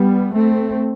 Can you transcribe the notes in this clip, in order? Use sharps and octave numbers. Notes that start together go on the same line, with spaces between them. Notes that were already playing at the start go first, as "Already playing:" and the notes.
Already playing: G3 B3
A3 C4